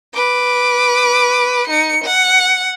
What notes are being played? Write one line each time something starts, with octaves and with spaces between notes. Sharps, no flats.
B4 D6
D#4 C#7
F#5